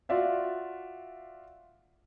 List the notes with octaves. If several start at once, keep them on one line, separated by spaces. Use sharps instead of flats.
F4 F#4 D5 E5 F5